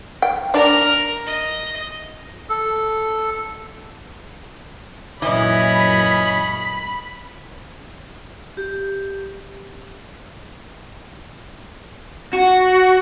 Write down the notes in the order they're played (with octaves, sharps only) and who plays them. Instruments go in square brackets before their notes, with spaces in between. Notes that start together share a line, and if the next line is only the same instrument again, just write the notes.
[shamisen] G5
[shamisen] D4 D5 [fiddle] A#4
[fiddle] D#5
[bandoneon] A4
[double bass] F#2 A#2 [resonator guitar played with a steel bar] E3 [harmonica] C#4 D#5 [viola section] B5
[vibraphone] G4
[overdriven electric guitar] F#4